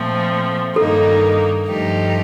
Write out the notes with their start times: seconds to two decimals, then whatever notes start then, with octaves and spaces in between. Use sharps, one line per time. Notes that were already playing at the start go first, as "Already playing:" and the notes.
Already playing: A#2 F3 A3 C4
0.76 G2 D#3 A#3 D#4 A4
1.66 G2 F3 A3 D#4 G4